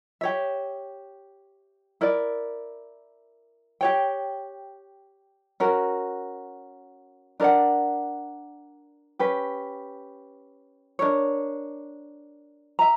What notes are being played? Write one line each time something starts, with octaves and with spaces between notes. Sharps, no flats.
G4 C#5 E5
E4 A#4 D5
G4 C#5 G5
C#4 F#4 A#4
D4 A#4 D5 F#5
C#4 G4 B4
D4 A#4 C#5
E5 A#5